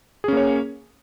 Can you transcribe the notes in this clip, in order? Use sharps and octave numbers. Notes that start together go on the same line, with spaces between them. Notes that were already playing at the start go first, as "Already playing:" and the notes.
A#3 C#4 G#4 C#5